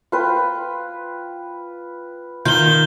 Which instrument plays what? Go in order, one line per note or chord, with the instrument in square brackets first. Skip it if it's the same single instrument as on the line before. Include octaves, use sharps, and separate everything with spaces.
[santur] F4 B4 G5
[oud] D#3 [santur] F4 [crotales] G6 G7